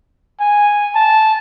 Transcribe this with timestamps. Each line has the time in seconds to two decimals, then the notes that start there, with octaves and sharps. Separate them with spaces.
0.40 G#5
0.95 A5